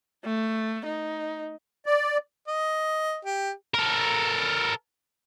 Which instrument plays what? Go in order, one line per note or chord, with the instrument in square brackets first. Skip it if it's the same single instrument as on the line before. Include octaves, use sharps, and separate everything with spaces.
[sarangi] A3
D#4
[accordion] D5
[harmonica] D#5
G4
[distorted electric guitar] A4 A#4